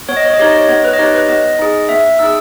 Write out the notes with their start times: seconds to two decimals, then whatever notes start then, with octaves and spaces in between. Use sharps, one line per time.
0.09 B3 C#5
0.17 D#5
0.25 C#5
0.34 D#5
0.39 D#4 G4 C#5
0.49 D#5
0.58 C#5
0.69 B3 C#5
0.84 B4
0.93 D#5
0.99 D#4 G4 C#5
1.15 B4
1.29 B3 D#5
1.59 D#4 G#4
1.89 B3 E5
2.19 D#4 G#4 E6